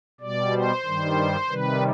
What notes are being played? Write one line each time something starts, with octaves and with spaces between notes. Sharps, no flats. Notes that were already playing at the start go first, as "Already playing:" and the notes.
B2 G3 D5
C5
G2 D#3 G3
C3 D#3 G3 B4